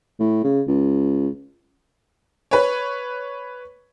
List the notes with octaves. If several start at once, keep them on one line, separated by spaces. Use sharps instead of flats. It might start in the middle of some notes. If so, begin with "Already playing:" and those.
A2
C#3
C#2
B4 C#5